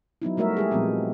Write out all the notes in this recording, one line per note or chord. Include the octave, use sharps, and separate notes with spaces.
F#3 B3 D#4 E4
G3 A3 F#4 A#4 E5
G#3 G4 G#4
A#2 F3 G#3 B3 C4